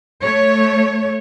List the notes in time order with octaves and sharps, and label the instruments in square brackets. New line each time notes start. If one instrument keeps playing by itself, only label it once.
[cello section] A3 C#5